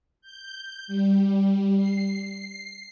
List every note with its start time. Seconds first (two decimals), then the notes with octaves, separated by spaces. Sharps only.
0.21 G6
0.87 G3
1.76 C7